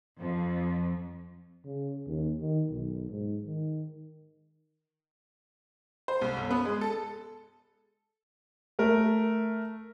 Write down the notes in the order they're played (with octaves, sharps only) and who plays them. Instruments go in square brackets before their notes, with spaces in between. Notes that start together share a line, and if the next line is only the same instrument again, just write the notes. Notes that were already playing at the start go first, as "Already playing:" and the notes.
[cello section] F2
[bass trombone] C#3
D#2
D#3
B1
G#2
D#3
[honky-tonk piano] C5
C2
G1
B3
G#3
A4
[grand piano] A3 A#4